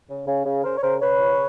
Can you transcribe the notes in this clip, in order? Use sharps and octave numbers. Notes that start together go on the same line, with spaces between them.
C#3
C#3
C#3
C#3 A#4 C5
C#5
C#3 A#4 C5
C#3 B4 C#5
F3